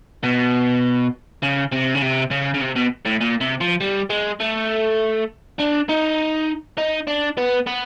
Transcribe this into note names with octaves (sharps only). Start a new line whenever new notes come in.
B2
C#3
C3
C#3
C3
C#3
C#3
C3
B2
A2
A#2
C3
F3
G3
G#3
A3
D4
D#4
D#4
D4
B3
B3